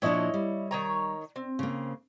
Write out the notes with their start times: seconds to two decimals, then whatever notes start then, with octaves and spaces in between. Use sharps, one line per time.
0.02 A#2 F3 D4 E4 C#5 D#5
0.34 G3
0.71 D#3 C#5 A#5
1.36 C4
1.59 C#3 A#3